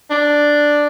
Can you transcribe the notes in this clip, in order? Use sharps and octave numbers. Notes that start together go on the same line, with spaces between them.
D4